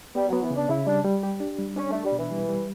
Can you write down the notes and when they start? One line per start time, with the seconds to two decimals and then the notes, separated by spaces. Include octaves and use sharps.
0.15 G3 B3
0.28 F#3
0.33 B3
0.43 E3
0.51 C#3
0.56 D4
0.69 C#3 E4
0.87 G3 D4
1.04 G3
1.23 G4
1.40 D4
1.58 G3
1.76 C#4 D4
1.90 A3
1.95 D4
2.04 G3
2.12 B2
2.18 E3
2.31 G3
2.49 G3